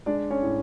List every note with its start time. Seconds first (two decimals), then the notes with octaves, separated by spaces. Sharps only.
0.06 G#3 D4 D5
0.30 C#4 C#5
0.43 A2